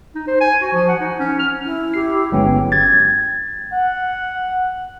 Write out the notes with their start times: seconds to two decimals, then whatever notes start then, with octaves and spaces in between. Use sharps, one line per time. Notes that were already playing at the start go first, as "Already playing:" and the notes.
0.15 D#4
0.27 C5
0.41 G#5
0.62 F#4
0.73 F3
0.89 F#5
1.00 D#4
1.19 C#4
1.39 F6
1.65 E4
1.94 G4 C7
2.32 G1 D3 F#3 G#3 B3 C#4 G5
2.72 G#6 A6
3.72 F#5